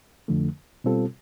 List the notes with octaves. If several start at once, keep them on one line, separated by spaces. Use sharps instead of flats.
F2 D3 F3 A3
B2 G3 C4 F4 A4